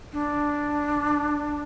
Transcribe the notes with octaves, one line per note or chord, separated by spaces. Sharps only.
D4